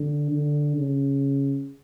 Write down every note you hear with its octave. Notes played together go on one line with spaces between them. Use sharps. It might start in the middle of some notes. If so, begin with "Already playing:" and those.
Already playing: D3
D3
C#3